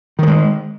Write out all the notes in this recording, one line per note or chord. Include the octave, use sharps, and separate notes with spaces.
D#3 F3 G#3